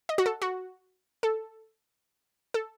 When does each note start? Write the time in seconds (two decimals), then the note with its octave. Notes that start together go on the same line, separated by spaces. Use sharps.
0.09 D#5
0.18 F#4
0.26 A4
0.42 F#4
1.23 A4
2.54 A4